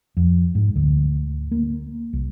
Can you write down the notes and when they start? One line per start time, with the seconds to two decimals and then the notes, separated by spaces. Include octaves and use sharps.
0.17 F2
0.55 G#2
0.76 D2
1.51 A#3
2.13 C2